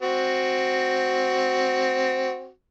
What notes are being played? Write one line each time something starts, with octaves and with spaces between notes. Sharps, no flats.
C4 F#4